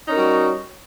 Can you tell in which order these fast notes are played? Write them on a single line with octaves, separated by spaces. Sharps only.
D#4 C#4 A#4 F#4 G3